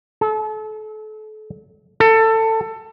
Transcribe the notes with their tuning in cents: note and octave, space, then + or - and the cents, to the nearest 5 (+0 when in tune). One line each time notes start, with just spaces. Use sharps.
A4 -35
A4 +20